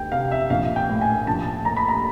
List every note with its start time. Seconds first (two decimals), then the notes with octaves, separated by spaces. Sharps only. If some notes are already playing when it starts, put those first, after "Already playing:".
Already playing: D2 G5
0.12 C3 F5
0.31 E5
0.50 A#1 F5
0.76 G5
0.89 A2
1.01 G#5
1.27 A#1 A5
1.65 A#2 A#5
1.77 B5
1.89 A#5